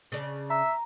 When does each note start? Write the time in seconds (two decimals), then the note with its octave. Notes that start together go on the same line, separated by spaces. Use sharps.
0.12 C#3 D4
0.50 E5 A#5